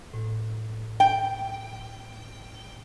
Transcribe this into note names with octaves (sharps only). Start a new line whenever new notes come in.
A2
G5